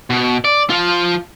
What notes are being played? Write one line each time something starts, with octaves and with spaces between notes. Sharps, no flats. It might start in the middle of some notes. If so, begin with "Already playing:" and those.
B2
D5
F3 F4